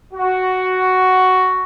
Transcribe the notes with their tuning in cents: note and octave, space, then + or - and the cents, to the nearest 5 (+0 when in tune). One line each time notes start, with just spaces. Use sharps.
F#4 +5